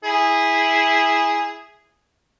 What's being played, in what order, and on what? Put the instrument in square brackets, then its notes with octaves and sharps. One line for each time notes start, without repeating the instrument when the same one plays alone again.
[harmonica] E4 G#4